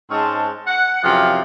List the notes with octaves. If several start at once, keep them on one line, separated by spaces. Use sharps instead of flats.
G#2 G#3 C4 C#4 A5
F#5
F#2 C3 E3 F3 G#4 F5